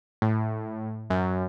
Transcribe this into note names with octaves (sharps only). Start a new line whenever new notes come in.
A2
F#2